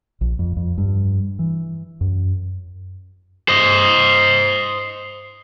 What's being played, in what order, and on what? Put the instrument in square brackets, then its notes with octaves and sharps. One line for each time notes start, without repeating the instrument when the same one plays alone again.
[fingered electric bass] A#1
F2
F2
G2
E3
F#2
[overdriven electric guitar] C5 D#5